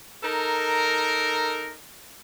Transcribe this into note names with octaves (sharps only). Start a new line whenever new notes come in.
D#4 A4 A#4